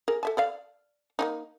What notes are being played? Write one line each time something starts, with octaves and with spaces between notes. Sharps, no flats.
G#4 A#4
A4 E5 A5
A4 D5 F5
A#3 D4 D#4